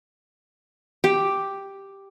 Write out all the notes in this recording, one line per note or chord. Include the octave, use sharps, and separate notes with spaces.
G4